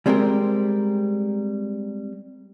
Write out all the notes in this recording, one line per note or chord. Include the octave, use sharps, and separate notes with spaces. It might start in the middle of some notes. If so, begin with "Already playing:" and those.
G3 G#3 C4 G4 A#4